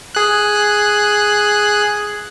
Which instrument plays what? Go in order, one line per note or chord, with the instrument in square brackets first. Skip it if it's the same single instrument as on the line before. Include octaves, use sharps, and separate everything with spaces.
[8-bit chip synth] G#4 F#6